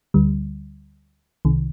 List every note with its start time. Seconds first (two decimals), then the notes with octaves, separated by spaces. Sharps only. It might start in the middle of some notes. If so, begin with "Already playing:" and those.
0.14 D2 D3 G3
1.45 C2 C3 D#3